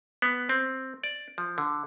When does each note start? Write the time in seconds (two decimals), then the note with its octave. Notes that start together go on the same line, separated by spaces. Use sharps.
0.22 B3
0.49 C4
1.03 D5
1.38 F3
1.58 D3